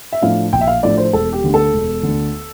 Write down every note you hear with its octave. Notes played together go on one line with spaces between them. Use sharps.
E5
A2 F3 A3 D4 F5
A#1 G5
E5
F5
A2 F3 A3 D4 D5
C5
E1 A4
G4
D2 D3
A4
E1
D2 D3